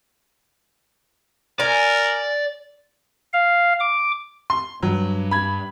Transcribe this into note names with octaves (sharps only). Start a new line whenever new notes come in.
A#4 D5 G#5
F5
D6
C6
G2 F#3 G3
B5 G#6